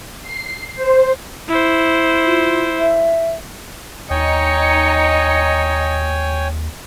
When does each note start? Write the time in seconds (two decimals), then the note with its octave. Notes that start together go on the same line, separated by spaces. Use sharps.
0.22 C7
0.75 C5
1.49 E4 C5
2.24 F4
2.79 E5
4.10 D#2 D#4 C#5 D#5 G5 G#5 C#7